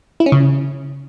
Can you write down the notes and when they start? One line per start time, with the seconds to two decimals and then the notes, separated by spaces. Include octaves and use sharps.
0.20 E4
0.26 C#4
0.32 C#3